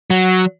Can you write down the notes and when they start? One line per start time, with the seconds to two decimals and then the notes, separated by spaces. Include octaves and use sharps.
0.10 F#3